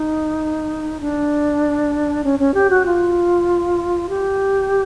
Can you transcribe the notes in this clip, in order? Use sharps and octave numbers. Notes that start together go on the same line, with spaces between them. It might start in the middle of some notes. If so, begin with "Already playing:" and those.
Already playing: D#4
D4
C#4
C#4
G4
F#4
F4
G4